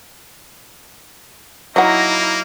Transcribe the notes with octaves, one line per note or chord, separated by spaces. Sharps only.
F#3 A#3 D#4 E4 F#4 D#5 F#5 A#6